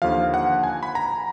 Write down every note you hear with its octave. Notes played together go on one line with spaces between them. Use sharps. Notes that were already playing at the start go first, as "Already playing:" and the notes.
D#2 D3 F3 F5
F#5
G#5
B5
A#5